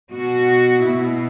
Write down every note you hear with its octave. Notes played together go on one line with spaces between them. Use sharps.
B2 F#4
B2 E4